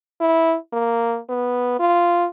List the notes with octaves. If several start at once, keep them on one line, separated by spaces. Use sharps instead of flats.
E4
A#3
B3
F4